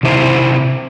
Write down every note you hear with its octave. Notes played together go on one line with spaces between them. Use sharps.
C3 D#3 E4 C5